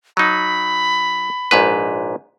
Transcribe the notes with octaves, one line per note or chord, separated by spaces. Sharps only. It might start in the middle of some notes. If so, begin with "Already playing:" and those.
F#3 D#4 B5
A#1 G#2 B4